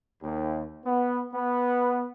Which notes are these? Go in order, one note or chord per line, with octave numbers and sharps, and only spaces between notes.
D#2
B3
B3